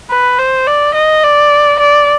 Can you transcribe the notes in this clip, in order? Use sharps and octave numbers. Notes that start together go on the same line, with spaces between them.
B4
C5
D5
D#5
D5
D5